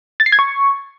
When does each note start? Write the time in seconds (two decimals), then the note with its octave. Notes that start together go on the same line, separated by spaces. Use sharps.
0.20 A6
0.26 C7
0.32 G#6
0.39 C#6